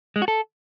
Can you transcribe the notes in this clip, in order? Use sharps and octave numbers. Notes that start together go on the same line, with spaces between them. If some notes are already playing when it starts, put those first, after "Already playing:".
G#3
F#4
A4